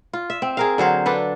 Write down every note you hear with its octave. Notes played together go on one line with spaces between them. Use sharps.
F4
E5
C4
G#4 A#4 F5
D3 F#3 C5 F5
D4 A4 B4